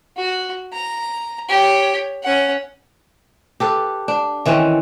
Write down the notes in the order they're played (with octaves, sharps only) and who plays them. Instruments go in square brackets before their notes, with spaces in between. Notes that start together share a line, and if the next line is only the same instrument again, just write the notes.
[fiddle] F#4
A#5
G4 C#5
C#4 F#5
[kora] G4 A4 B4
D4
D#3 E3 C4 C#4